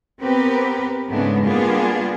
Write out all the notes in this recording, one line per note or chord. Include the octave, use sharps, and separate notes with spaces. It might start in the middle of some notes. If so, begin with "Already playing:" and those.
B3 C4 G4 A#4 B4
G#2 C#3 G#3 A3 B3 D4
G3 A#3 B3 D4 F4 G#4